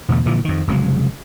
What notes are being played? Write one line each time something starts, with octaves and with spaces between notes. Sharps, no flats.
E2 B2 D3 A3
A#2 D3 E3 F3
F2 D#3
F1 C#3 F#3 G#3